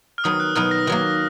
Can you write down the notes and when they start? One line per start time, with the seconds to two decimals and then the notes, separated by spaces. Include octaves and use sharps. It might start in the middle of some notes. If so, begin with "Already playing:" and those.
0.18 F6
0.24 D#3 F#3 B3 D#4 D#6
0.40 F#6
0.55 B2 F#3 B3 D#4 F6
0.71 A#6
0.87 D#3 F#3 A#3